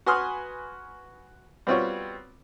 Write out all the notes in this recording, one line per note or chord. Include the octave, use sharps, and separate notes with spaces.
F#4 B4 G#5 C6 D#6 F6
G3 B3 C4 F4 F#4 C#5